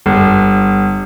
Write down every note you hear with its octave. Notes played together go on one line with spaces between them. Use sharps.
G1